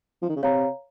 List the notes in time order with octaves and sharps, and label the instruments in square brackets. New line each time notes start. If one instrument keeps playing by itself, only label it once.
[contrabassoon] F3
D#3
C#3
[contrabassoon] C3 [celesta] C#5 F5 A#5